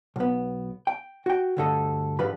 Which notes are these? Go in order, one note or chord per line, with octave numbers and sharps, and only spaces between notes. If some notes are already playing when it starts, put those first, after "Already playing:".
B1 B3
G5
F#4 G5
D2 G2 D3 A3 A4 D#5
G#2 D3 F3 G4 B4 B5